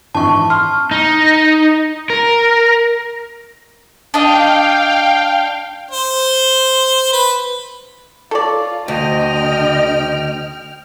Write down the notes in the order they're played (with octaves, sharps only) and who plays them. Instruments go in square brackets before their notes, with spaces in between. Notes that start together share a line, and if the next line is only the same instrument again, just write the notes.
[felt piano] G#1 E3 D4 [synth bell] A5 C#6
[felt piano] C6 [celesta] F6
[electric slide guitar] D#4
A#4
[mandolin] D4 D#5 [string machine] F5 G5
[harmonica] C5
B4
[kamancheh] F4 [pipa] A4 C#5 D5
[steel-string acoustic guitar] D2 [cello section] D3 D#5 [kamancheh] G5 F6